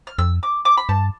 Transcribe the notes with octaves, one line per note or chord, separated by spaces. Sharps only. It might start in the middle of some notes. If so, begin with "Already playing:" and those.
F6
F2 E6
D6
D6
B5
G2 A5